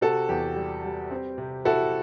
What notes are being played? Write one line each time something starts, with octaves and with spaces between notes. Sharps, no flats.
C3 F#4 A4
E2 G4
G3
G3
C4
C3
E4 F#4 A4